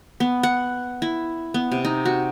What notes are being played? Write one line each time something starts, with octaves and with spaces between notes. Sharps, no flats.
B3
F#5
E4
B3
C3
D#4
F#4